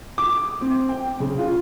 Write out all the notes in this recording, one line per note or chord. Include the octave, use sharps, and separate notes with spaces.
D6
C4
G5
C#3
F4